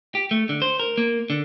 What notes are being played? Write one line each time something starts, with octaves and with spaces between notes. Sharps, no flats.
G4
A3
D3
C5
A#4
A#3
D3